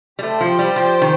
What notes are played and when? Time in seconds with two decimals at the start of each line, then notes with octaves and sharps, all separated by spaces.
0.19 G3
0.23 A3 G4 C5 G5
0.41 F3
0.59 G3
0.76 F3
1.01 D#3